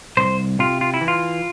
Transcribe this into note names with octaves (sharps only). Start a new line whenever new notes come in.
C2 C5
C3 F4
F4
E4
E3
F4